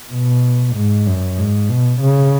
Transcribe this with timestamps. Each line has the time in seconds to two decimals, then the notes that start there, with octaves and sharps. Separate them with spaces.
0.12 B2
0.76 G#2
1.07 F#2
1.38 G#2
1.69 B2
2.01 C#3